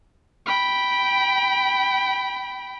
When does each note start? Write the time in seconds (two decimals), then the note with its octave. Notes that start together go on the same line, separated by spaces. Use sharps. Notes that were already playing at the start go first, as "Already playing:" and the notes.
0.47 G5 B5